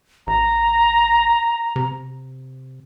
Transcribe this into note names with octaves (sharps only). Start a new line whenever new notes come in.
A1 A#5
C3